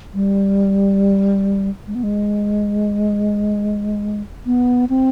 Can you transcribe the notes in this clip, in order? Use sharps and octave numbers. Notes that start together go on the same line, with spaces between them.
G3
G#3
B3
G#3
B3
C4